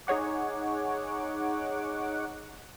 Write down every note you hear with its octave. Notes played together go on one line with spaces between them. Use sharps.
D#4 G#4 C#5 F#5 D6